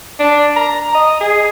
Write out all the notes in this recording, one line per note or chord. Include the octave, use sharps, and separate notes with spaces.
D4
A#5
D#5
G#4